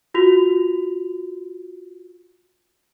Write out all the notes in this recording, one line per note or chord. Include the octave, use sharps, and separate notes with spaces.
F4 F#4 F7